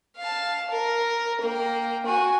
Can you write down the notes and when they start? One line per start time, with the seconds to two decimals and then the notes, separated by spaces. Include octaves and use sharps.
0.17 F5 A5
0.71 A#4
1.41 A#3 G5
2.06 F#4 G#5